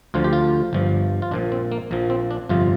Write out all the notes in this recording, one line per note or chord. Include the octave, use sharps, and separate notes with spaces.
D2 D3 F3 F4
G4
F4
G1 G2 F3
F4
A#1 A#2 F3 D4
C4
A#3
A#1 A#2 F3 A#3
C4
D4
G1 F2 C3 F3 F4